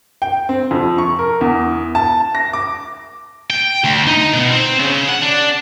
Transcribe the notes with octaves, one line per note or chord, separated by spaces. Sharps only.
G5
C4
F2
C#6
A#4
E2
A5
A#6
D6
G5
D2
D#4
B2
C4
C#3
F#5
D4